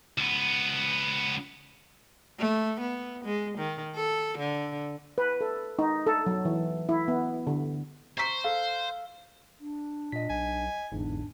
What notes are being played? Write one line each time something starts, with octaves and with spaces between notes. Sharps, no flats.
C#2 B3
A3
B3
G#3
D#3
A4
D3
B4
A4
D#4
A4
F#3
E3
E4
B3
D3
C5 A#5 C#6 B6
A4 F5
D4
A#2 D#5 B6
B1 G#5
G1 E2 G#2 D4